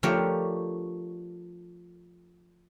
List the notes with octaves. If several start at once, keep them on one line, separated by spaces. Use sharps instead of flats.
F3 A3 D4 G4 A#4 C#5